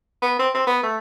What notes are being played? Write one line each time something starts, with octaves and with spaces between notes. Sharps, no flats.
B3
C4
C4
B3
A3